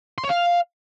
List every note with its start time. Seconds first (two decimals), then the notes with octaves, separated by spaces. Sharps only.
0.18 C6
0.24 C#5
0.29 F5